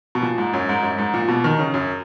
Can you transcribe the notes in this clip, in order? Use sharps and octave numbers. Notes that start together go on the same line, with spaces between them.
B2
A#2
G#2
F#2
G#2
F#2
G#2
A#2
B2
D#3
C#3
F#2